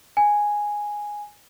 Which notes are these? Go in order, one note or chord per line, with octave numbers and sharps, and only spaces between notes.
G#5